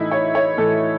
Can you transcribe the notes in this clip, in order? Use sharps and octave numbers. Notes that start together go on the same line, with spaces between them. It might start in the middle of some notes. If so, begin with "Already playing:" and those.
Already playing: A2 E3 A3 D#4 E4
C#5
C#5
A2 E3 A3 A4